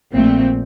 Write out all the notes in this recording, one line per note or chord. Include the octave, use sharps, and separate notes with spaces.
A#1 A#2 A3 C4